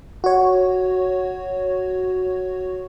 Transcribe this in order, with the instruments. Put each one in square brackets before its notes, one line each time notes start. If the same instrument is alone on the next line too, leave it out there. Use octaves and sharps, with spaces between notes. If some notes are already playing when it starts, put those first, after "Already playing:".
[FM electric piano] F#4 C#5